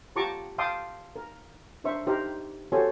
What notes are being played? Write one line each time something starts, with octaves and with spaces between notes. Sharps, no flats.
F4 G4 A5 A#5 C#6 D6
F5 G5 A5 C6 D6 D#6
A#4
D4 A#4 C5 E5 C#6
D#4 G4 A#4 C5
F#4 G4 A4 C5 C#5 G#5